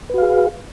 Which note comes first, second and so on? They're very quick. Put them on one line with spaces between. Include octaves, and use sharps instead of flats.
B4 F#4 F5 G#4